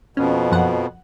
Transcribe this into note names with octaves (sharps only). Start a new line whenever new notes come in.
F2 B2 C#4
F#2 F3 F#5